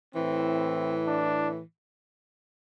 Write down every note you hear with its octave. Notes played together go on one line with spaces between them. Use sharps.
A2 E3 C4
D4